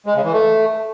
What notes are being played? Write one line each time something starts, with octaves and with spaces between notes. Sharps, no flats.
G#3
C#3
E3
A3